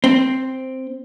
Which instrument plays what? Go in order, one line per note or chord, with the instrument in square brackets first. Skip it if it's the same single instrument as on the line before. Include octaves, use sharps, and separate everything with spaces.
[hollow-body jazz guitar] C4